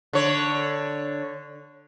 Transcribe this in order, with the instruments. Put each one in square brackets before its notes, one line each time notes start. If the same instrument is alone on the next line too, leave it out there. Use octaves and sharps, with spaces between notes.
[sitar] D3 C#5